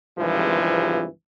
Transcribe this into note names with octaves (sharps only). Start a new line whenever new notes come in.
G#1 C#2 G2 C3 E3 F3